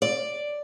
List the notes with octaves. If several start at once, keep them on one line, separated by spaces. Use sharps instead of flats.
D5